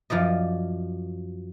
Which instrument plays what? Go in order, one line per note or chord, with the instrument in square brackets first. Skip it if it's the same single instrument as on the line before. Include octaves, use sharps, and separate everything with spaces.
[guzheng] F#2 F3 D5 D#5